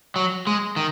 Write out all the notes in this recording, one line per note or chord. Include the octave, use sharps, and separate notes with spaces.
F#3
G#3
D#3